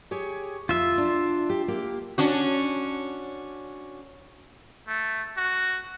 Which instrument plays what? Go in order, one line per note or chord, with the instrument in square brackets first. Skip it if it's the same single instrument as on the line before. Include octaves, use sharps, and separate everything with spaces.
[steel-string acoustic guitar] G4 G#4 C#5
[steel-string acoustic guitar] F2 [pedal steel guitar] F4 E5
[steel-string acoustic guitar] D4
G4
A#3 G4
[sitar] C#4 D4 F#4
[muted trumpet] A3
F#4